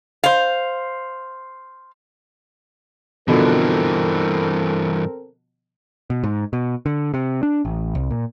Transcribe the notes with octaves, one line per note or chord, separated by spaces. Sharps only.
C5 F5
G2 B2 D3 E3 F3 C4 A4 A#4
B2
G#2
B2
D3
C3
D4
A1
C2
A#2